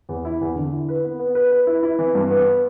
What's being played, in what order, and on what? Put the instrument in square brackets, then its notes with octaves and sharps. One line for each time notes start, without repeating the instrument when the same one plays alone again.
[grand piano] E2
E4
E2
D3
E4
B4
B3
B3
B4
B4
E4
E4
E3
G2
B3